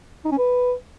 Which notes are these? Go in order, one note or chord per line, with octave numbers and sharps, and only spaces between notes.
D#4
C#4
B4